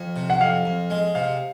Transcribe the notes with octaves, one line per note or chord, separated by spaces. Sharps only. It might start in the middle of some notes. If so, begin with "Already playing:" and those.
Already playing: F2
C3
F#5
F2 F5
F2
G#3
C3 F5